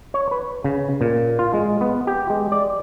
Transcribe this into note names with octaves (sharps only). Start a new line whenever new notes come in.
C#5
B4
C#3
A#2
F4
G#3
B3
G4
G#3
D5